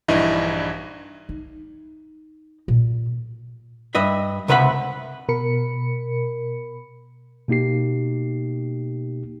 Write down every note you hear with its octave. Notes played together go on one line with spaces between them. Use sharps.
A#1 G2 E3 D#4 E4 D#5
D#4
A#2
G2 B4 D#5 E5
C#2 C3 B4 E5 F#5 B5
B2 A#4 B5 C#7
B2 A#3 D#4 G4 C7